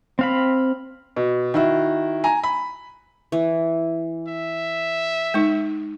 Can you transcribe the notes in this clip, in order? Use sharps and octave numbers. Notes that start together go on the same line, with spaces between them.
C4 F5 B5
B2
D#3 E4 F#4
G#5 A#5
B5
E3
E5
G#3 D#4